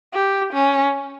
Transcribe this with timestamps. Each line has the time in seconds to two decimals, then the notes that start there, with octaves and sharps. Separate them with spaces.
0.14 G4
0.53 C#4